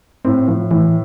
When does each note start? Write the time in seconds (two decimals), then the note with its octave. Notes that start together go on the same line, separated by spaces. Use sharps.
0.25 A2 C4
0.48 A2 F3
0.71 A2 E3